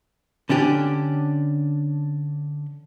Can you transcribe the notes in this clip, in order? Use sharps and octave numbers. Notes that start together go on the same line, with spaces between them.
D3 C#4 D4 G4